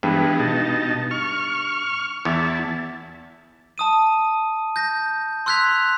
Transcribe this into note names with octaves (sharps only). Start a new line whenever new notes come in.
G2 E3 G#3 B3
B2 D#4 A5
C#6 F6
E2 E4 A5
A5 D#6 D#7
G6 A#6
C6 E6 F#6 G#6 B6 F7